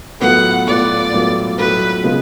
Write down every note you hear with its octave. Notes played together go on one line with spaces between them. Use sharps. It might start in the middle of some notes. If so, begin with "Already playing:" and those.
A2 F#3 B3 F4 F#5
A2 F#3 B3 F4 D5
A2 F#3 B3 F4
A2 F#3 B3 F4 B4
C#3 G#3 B3 F4